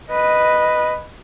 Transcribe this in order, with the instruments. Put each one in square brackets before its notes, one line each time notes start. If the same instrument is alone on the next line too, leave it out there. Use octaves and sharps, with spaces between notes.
[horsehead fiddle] B4 D#5